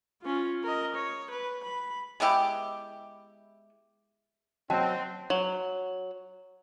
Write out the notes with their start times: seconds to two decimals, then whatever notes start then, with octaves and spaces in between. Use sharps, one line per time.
0.22 C#4 F4
0.63 A#4 D#5
0.95 C#5
1.31 B4
1.64 B5
2.20 G#3 B3 E4 G4
4.70 F#3 C4 D#5 G5 A5 C6
5.30 F#3